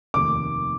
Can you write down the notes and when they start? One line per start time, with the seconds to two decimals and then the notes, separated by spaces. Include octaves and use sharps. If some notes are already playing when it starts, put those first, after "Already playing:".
0.14 F1 D#2 D#3 A3 D6